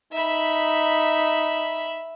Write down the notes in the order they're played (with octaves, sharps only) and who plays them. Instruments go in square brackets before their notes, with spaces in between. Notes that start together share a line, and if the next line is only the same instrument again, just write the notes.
[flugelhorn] D#4 [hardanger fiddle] E5 B5